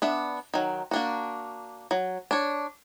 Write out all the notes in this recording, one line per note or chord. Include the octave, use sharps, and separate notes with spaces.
B3 D4 E5
D#3 F#3
A#3 D4 F#4
F#3
D4 C#5